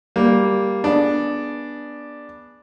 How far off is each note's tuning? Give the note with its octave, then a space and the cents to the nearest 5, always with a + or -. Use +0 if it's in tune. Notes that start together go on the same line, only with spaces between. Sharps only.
G3 +0 A#3 +0
B3 -15 D4 +0 G#4 +0